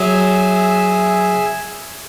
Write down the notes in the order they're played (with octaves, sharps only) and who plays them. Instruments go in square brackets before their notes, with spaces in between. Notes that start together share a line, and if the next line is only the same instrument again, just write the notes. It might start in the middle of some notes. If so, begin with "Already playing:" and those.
Already playing: [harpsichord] F#3 [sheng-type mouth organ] G#4 E5 G#5